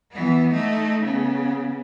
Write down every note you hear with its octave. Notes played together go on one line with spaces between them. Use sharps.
E3 B3
A3 D#4
C#3 B3